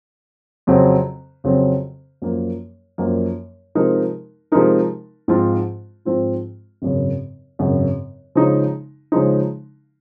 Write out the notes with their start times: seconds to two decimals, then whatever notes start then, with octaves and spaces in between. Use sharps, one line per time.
0.67 F2 C#3 F#3 C4
1.44 F2 C#3 F#3 C4
2.22 F#2 F3 A#3
2.98 F#2 F3 A#3
3.75 C3 F3 G#3 D#4 A#4
4.52 C3 F3 G#3 D#4 A#4
5.28 G#2 F3 C4 F4
6.05 G#2 F3 C4 F4
6.82 G#1 F#2 C#3
7.59 G#1 F#2 C#3
8.35 C#3 F3 G#3 D#4
9.12 C#3 F3 G#3 D#4